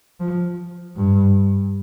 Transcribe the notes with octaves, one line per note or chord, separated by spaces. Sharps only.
F3
G2